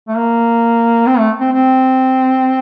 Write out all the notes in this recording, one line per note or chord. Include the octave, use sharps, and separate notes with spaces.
A3
A#3
C4
A3
C4
C4